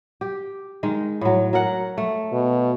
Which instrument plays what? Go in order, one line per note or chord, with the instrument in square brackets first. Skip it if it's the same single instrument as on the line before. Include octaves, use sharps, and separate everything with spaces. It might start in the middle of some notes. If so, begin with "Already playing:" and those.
[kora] G4
D#3 G#3
A2 F#3
F#3 A#4 F#5
A3
[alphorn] B2